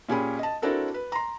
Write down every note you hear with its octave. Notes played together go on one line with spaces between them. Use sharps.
A#2 C#4 G4 G#4 B5
D#5 A5
C4 D4 E4 F#4 A4 A#4
B4
A#5 C6